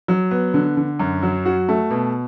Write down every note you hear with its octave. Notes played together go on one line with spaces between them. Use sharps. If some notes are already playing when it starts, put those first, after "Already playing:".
F#3
B3
D3
D3
F#2
F#3
F#4
A3
B2